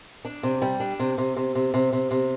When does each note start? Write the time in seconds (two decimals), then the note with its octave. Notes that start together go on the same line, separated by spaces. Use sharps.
0.25 D4
0.43 C3
0.62 G3
0.80 D4
0.99 C3
1.18 C3
1.37 C3
1.55 C3
1.74 C3
1.93 C3
2.11 C3